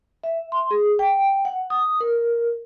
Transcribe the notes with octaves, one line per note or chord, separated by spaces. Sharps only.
E5
C6
G#4
G5
F#5
D#6
A#4